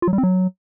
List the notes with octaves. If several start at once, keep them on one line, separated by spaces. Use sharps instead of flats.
F4
F#3
G3
C4
F#3